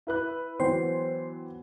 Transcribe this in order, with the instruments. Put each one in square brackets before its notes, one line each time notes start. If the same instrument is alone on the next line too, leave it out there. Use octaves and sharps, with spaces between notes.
[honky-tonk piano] E4 B4 F#6
[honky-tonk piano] E3 F#3 [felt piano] B3 G5 [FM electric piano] C5